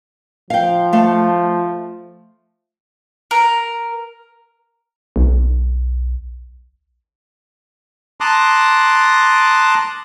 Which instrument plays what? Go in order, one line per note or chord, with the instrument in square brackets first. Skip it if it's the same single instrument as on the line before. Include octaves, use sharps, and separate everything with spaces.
[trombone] F3 [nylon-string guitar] F5 G5
[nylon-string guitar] A3 F5
[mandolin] A#4
[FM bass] B1
[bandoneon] A5 A#5 C6 D6 D#6 F#6